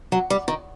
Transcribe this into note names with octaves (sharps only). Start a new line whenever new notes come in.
F#3
G3
D#3